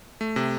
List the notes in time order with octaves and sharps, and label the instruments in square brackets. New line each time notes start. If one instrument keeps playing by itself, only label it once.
[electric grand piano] A3
C3